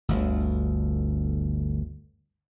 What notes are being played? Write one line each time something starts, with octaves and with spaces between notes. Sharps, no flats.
G1 D2